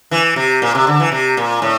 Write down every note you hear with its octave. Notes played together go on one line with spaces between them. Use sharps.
E3
C3
A#2
C3
D3
E3
C3
A#2
A2